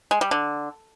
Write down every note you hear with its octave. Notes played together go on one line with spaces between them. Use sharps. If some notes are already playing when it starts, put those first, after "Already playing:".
G#3
G3
D3